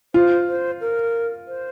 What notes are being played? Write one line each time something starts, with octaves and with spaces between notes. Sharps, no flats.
F4 C5
C5
A#4
C5